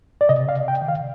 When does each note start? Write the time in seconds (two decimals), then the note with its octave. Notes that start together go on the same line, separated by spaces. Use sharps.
0.21 D5
0.29 C3 D#5
0.49 F5
0.56 C3
0.68 G5
0.82 D#3
0.88 F5